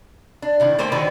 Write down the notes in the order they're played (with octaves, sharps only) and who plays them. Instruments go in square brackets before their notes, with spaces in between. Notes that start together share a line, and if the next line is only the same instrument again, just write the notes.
[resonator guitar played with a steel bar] D4
C3 D#3 E4
A3 A#3 A4 C5 G5
D3 D#3 F#4 B4 D5